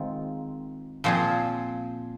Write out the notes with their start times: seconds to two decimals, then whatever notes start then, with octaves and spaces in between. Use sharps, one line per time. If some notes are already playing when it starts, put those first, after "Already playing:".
Already playing: D#3 G#3 C4 F4
1.04 A#2 F3 C4 F4 G#4